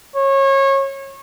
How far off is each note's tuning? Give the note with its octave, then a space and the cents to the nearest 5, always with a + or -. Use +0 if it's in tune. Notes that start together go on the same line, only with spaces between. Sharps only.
C#5 -25